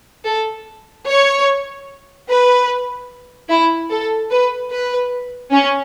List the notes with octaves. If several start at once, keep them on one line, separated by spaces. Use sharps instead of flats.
A4
C#5
B4
E4
A4
B4
B4
C#4